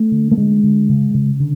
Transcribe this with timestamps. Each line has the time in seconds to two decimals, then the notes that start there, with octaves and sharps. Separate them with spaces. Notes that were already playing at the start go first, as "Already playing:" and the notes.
Already playing: A3
0.12 D3
0.31 A3
0.37 D3 G#3
0.64 D3
0.89 C#3
1.14 C#3
1.40 D3